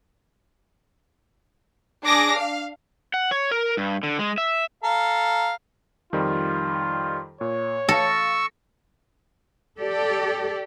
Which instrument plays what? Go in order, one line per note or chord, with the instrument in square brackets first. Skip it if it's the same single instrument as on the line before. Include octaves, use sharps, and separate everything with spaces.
[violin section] D4 G#4 D6 A#6
F5
[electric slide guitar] F#5
C#5
A#4
G2
D3
G#3
E5
[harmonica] A4 F5 A#5
[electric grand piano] F2 D#3 G3 [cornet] F4
[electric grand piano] A#2 [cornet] C#5
[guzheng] A4 [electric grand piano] F5 A#6 [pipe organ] C#6 E6
[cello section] G4 A4 D5